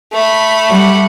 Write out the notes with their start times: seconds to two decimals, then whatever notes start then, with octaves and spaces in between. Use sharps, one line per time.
0.12 A3 B5
0.69 G3 F#5